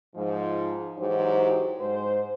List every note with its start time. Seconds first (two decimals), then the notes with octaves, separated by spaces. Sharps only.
0.15 G#2 F3
0.98 G#2 E3 F#3 G4 C5
1.80 G#2 C5